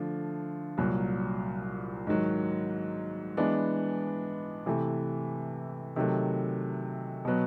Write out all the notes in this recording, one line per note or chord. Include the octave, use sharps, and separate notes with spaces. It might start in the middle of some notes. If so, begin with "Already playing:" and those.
Already playing: D3 F3 A3
C2 A#2 F#3
G#2 D#3 F#3
E3 G#3 B3 D4
C3 E3 A3
C3 D#3 F#3 A3
B2 F#3 B3